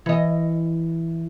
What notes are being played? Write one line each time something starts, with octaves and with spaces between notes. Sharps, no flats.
E3 D#5